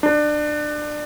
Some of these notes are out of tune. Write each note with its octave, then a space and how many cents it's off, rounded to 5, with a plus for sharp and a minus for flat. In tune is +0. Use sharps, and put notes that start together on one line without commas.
D4 +25